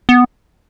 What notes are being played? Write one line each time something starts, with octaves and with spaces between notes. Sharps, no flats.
B3